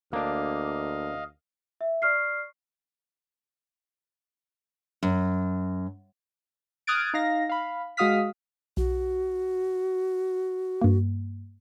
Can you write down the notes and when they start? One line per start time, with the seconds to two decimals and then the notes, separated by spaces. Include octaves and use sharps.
0.13 D2 A#3 D4 D#5 F5
1.81 E5
2.02 D5 C#6 F6 C7
5.03 F#2
6.87 D#6 F6 F#6 G#6 A6 D7
7.14 D#4 F5 A#6
7.49 F5 B5
7.97 G#3 F#4 F5 D#6 F6 B6
8.77 B1 F#4
10.81 G2 A#3